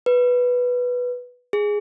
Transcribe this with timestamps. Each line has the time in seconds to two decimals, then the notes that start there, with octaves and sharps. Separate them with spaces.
0.06 B4
1.53 G#4